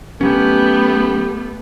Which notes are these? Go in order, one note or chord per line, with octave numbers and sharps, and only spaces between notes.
F#3 A3 B3 C#4 G4